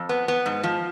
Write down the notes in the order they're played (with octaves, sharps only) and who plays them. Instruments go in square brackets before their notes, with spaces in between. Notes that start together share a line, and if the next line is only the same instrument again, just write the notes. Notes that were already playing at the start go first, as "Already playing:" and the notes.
Already playing: [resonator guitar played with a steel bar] F2
B3
B3
G#2
F3